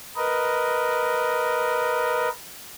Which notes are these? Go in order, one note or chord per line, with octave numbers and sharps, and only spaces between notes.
A#4 B4 D#5